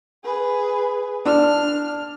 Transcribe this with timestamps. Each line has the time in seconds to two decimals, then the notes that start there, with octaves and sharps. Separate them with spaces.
0.24 G#4 B4
1.25 D4 F6